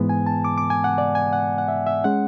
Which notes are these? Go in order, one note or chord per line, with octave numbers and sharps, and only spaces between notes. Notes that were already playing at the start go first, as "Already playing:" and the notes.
Already playing: G#2 E3 G#3 B3
G#5
A5
D6
D6
G#5
F#5
D5
G#5
F#5
F#5
E5
E5
G#3 C#4 F#5